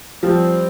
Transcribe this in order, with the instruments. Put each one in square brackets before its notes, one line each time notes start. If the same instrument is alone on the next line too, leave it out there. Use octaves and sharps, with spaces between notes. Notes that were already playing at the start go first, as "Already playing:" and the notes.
[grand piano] F3 [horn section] G3 C4